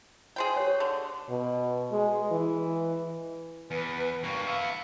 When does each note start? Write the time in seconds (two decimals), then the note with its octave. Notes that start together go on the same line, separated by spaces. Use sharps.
0.36 G#4 C5 G5
0.56 G4 C#5
0.80 D3
1.30 B2
1.92 G#3
2.32 E3
3.71 E2 B4
4.24 G2 A#3 C#6
4.47 B3 E5 F5